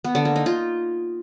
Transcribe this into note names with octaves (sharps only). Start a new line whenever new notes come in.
B3
D3
A#3
D#4
F4